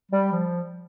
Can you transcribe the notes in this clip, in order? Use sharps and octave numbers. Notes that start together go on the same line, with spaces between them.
G3
F3